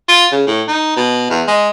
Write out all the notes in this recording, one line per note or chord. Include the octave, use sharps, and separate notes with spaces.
F4
C#3
A2
D#4
B2
E2
G#3